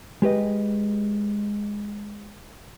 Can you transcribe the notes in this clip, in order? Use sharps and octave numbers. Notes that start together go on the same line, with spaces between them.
G#3 G4 B4 D#5